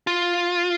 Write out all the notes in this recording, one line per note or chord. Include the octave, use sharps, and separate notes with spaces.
F4